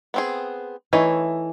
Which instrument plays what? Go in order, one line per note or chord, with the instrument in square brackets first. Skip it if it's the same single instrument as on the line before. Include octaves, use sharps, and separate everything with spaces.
[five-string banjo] B3 C4 G#4
[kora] E3 [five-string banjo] A3 D#4 C#5